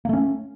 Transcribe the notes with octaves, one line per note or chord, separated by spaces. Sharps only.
A3 A#3 C#4